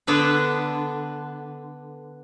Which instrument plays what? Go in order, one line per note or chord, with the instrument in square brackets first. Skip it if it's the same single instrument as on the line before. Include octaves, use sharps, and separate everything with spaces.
[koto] D3 B3 D4 A4 B4